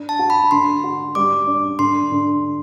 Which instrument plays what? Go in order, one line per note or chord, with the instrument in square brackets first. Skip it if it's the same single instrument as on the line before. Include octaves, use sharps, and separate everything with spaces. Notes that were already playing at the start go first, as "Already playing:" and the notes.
Already playing: [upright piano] D4
[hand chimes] A5
[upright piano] F#4
[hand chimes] B5
[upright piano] D3 [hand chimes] C6
[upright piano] F#4
[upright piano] G3 [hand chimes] D6
[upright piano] D4
[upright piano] D3 [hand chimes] C6
[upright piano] D3